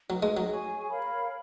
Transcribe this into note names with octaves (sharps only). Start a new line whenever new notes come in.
F#3 D#4 G#4 B4 D#5
G#3
F#3
G#4 C#5 G#5 C#6
A#4 C#5 F5 B5